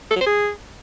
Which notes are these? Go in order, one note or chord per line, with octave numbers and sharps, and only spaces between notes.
A4
F#3
C5
G#4